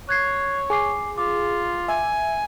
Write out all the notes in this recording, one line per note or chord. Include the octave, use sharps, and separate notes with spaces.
C#5 F#6 G#6 C7
G#4 G#5 D6 C7
F4 D6
E5 G#5